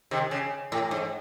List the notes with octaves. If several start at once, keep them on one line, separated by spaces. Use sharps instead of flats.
C3 D#3
C#3
A2
G#2